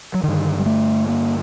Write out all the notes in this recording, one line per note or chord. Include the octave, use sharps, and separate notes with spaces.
F#3
G2 D3 D#3
G3
A3
A#3